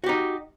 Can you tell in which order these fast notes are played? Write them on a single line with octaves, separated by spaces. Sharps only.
F#4 G4 D#4